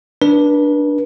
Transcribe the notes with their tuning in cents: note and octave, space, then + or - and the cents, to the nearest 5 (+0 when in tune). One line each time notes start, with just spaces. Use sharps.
D4 +0 B4 -35